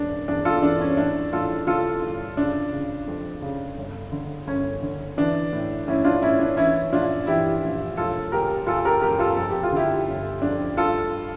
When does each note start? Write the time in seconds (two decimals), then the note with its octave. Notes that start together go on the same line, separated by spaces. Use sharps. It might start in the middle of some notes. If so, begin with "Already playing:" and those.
Already playing: E1 E3 D4
0.28 E2 D4
0.45 F4 A4
0.62 E3 D4
0.81 C#4
0.97 A1 D4
1.32 A1 F4 A4
1.67 D3 F4 A4
2.03 G2
2.37 C#3 D4
2.73 C#3
3.07 F2
3.42 C#3
3.77 G1
4.12 D3
4.47 G1 C#4
4.82 D3
5.17 E3 D4
5.53 A2
5.88 A1 C#4 E4
6.05 D4 F4
6.22 A1 C#4 E4
6.40 D4
6.57 E3 C#4 E4
6.92 A#1 D4 F4
7.27 E3 E4 G4
7.62 A#1
7.97 E1 F4 A4
8.32 D2 G4 A#4
8.67 D2 F4 A4
8.85 G4 A#4
9.02 E1 G4 A#4
9.19 F4 A4
9.37 F2 A4
9.50 G4
9.63 F4
9.72 D3 E4 G4
10.07 G1
10.42 F2 D4
10.77 G2 F4 A4